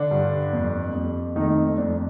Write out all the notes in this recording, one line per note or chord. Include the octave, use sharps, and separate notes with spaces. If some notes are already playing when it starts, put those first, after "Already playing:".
Already playing: D3 D4
G2
F2
F2
D#3 A3 D#4
C4
F2 D4